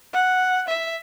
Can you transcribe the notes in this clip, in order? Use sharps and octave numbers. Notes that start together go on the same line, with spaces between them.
F#5
E5